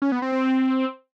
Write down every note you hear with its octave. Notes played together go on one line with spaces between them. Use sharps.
C#4
B3
C4
C4